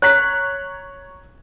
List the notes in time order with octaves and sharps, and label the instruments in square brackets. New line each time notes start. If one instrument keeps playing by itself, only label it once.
[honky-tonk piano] C#5 A#5 B6 [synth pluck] F#6